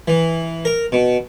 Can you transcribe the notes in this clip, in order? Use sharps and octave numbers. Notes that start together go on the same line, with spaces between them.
E3
A#4
B2